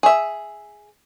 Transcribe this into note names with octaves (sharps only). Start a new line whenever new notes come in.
G#4 E5